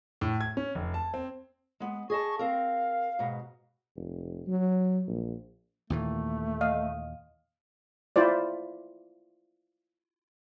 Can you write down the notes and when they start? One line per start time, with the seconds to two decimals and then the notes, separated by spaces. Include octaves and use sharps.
0.21 A2
0.41 G#6
0.57 C#4
0.75 F1
0.94 A5
1.14 C4
1.80 G#3 B3
2.10 G#4 D#5 A5 C#6
2.39 C4 A#4 F5
3.19 G#2 B2
3.96 F1
4.47 F#3
5.08 A#1
5.90 D#2 A#2 E3 A3
6.61 D#5 F5
8.16 E4 F4 C5 D5